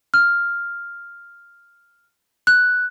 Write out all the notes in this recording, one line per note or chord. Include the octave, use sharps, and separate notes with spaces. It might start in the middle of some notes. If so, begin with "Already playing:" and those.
F6
F#6